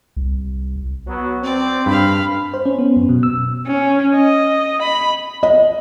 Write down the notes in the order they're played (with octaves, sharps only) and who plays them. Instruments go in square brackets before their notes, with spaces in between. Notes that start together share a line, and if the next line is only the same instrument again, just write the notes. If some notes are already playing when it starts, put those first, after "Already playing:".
[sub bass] C2
[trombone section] F#3 B3
[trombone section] C4 [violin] D5
[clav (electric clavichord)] G2 [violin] F5 B5
[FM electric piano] C5
C#4
B3
F#2
B2
E6
[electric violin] C#4
D#5
B5
[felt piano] D#5